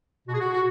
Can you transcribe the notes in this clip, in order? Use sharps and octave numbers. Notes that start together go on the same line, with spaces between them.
B2 F#4
G#4
F#4
F#4